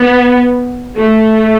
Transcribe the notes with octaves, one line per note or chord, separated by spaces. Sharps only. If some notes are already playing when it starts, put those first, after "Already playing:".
Already playing: B3
A3